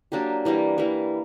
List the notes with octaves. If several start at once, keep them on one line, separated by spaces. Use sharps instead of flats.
F#3 A#3 D4 G4
E3 G3 A#3
E3 G3 A#3